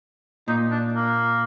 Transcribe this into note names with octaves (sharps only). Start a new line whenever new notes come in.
A#2 D#4
D4
A#3